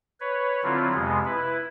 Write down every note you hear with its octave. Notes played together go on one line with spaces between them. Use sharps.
B4 C#5
D3 F#3 C4 E4 F4
F2 C3 G#3 B3
E4 B4